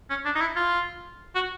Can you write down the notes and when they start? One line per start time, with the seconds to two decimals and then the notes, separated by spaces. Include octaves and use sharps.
0.10 C#4
0.25 D4
0.35 D#4
0.41 E4
0.56 F4
1.35 F#4